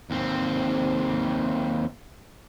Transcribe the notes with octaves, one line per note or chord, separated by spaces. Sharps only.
D#2 C4